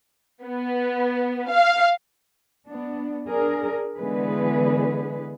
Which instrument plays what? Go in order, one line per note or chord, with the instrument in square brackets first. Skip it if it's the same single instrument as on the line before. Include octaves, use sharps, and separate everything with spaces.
[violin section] B3
F5
[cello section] B3 D4
D4 G#4 A#4
D3 E3 G#3 B3 G#4 B4